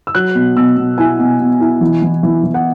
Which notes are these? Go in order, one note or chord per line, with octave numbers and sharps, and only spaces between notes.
E6
F#3 F#6
B2
B2 E6
B2
E4 G#5
B2
B2
E4
E3
E3
E3
E3
F#5